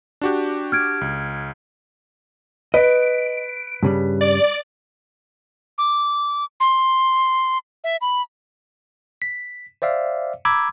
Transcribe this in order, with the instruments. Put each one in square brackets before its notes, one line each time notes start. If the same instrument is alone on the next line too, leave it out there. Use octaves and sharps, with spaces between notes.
[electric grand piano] D4 F#4 G4
[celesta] F6 G#6 D7
[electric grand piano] C#2
[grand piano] B4 [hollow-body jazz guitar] D#5 [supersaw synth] D7
[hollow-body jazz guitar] G2 C#3 G3
[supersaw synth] D5
[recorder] D6
C6
E5
B5
[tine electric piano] B6
C5 D5 E5 F5
A#5 B5 D6 E6 G#6